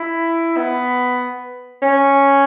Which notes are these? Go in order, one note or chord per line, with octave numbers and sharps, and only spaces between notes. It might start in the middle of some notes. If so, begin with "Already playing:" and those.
Already playing: E4
B3
C#4